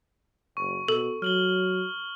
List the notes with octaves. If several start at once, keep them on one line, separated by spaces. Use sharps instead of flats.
F#1 C#6
B2 A4
F#3 F6 F#7 G7